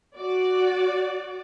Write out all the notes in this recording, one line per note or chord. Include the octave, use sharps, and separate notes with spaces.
F#4 D5